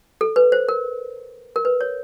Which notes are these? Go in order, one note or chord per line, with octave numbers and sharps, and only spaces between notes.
A4
B4
C5
A#4
A#4
B4
C#5